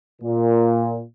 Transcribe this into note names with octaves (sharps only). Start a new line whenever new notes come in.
A#2